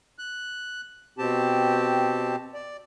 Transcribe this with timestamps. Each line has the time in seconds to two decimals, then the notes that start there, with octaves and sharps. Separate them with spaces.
0.19 F#6
1.18 B2 C4 G4 A5
2.54 D5